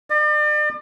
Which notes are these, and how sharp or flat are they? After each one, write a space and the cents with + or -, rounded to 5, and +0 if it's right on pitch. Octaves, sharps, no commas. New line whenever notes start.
D5 +40